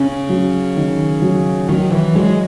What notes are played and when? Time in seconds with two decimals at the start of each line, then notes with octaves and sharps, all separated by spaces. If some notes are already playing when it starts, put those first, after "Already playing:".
Already playing: C#3 C#4
0.29 F#3
0.76 D#3
1.22 F#3
1.69 D#3 F#3
1.92 E3
2.15 F#3 G#3